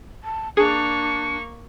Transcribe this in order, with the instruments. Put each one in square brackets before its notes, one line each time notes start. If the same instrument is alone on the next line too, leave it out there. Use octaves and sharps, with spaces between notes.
[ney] A5
[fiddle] A#3 C#6 [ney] D4 [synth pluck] G#4 [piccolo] C#7